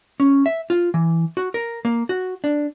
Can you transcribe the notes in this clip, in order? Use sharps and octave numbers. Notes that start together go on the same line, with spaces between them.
C#4
E5
F4
E3
F#4
A#4
A#3
F#4
D4